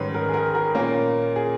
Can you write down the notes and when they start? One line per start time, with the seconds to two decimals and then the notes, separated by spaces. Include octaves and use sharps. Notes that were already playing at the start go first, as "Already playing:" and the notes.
Already playing: G#2 D#3 G3 C#4 B4
0.14 A#4
0.29 G#4
0.34 A#4
0.55 A#4
0.75 A#2 A#3 C#4
1.36 G#4